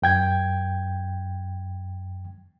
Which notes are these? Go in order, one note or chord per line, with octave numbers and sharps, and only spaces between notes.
F#2 G5 G#6